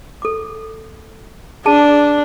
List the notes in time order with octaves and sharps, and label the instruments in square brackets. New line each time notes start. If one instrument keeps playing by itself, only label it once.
[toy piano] A4 D6
[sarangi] D4 [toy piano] G#4 A5